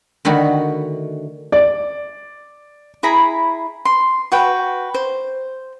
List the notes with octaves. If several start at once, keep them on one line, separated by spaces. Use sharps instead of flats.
D3 D#3 A3 F#4 B5
D5
E4 G#4 A#5 B5
C6
F#4 B4 G5
C5